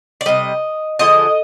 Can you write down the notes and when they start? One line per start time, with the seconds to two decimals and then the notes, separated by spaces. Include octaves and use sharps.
0.21 D5
0.26 C3 G3 D#5
0.99 D3 F3 G#3 D#5